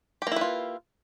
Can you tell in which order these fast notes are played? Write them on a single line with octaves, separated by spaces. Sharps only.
G4 A#3 E4 B4 F4